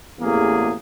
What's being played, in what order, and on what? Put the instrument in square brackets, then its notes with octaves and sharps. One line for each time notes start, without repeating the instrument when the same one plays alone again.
[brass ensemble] A1 E2 A#3 G#4